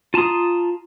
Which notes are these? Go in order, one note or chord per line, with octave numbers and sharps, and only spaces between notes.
F4 A5 A#5 C6 D#6